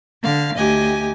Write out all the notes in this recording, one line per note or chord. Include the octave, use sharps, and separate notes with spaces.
D3 F5
D2 G4 D#5 G#5